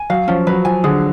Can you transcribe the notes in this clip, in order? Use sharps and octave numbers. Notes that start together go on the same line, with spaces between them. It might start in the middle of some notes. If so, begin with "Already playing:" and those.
Already playing: G#5
F#3 F5
F3 C#4
F#3 B4
F3 G#5
D3 G#4